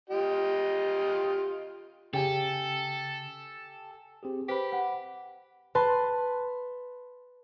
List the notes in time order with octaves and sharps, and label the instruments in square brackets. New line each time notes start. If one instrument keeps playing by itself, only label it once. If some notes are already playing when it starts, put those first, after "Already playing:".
[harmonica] F4 G4 D#5
[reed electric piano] C#3 [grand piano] G4 G5 G#5 [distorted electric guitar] A4
[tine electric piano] C4 G4 G#4
[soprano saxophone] G4 [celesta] B4 C5 [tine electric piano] B5 B6
[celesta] F#5
[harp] B4 A5 C6